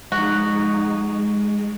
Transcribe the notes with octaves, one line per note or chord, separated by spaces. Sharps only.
F3 G#3 D#4 F#4